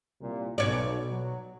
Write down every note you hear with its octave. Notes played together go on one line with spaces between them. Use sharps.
C2 A#2
B1 B2 C#5 D5
F#3